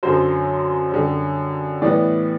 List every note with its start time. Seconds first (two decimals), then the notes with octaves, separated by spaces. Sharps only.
0.03 F#2 D3 F#3 C5
0.92 F#2 D3 G3
1.82 A2 E3 G3 B3 D5